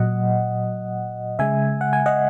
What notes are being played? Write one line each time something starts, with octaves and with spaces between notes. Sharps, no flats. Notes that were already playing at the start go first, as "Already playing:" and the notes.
Already playing: A#2 F#3 D#5 F#5
C#3 G#3 E5 G#5
F#5
G#5
D#5 F#5